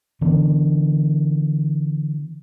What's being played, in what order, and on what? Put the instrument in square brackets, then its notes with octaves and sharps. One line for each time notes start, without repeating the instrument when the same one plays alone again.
[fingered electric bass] D3 E3 B3 D4